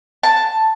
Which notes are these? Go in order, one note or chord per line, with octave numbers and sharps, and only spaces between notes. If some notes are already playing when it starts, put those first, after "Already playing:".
A5